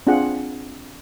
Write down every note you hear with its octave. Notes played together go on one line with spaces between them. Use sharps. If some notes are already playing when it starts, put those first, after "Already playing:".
C4 D4 F4 G#4 F#5